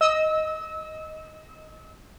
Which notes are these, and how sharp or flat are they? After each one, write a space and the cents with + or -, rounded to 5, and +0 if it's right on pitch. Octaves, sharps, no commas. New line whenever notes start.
D#5 +5 E6 -30